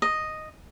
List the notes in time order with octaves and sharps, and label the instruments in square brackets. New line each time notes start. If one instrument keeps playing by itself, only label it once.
[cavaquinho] D#5